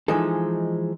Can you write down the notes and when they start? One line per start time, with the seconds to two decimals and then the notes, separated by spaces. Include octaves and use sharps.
0.08 E3 F3 G#3 D#4 A4